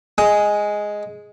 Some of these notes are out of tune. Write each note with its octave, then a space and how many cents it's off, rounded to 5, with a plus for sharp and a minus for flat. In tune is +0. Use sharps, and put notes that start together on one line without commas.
G#3 +0 D#6 +20